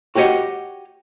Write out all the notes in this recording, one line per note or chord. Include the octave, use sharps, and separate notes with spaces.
F#4 G4 C#5 D#5 F#5